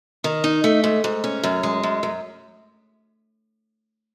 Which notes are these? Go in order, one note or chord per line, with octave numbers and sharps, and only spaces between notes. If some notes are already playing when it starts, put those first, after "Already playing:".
D#3
D#4
A3
G#2
G#2
C#4
F#2
G#3
F#2
F#2